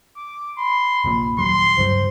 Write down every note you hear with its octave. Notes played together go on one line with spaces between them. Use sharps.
D6
B5 C6
F1 A#1 A#2
D#1 F#3 C6
C#2 G2 F#3 C5